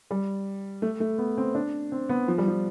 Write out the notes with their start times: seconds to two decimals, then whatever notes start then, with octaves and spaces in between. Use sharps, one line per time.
0.11 G3
0.82 A3
1.00 A3
1.18 B3
1.38 C4
1.55 D4
1.92 C4
2.09 B3
2.28 F3
2.38 G3
2.48 F3